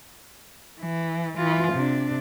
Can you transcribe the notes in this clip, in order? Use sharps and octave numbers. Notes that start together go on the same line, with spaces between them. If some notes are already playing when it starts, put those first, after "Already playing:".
E3
E3 F4
C3 D4